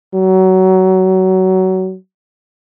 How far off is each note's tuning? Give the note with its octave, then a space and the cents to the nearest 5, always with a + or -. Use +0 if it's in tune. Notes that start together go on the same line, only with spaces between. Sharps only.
F#3 +20